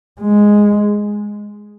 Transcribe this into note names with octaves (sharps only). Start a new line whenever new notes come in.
G#3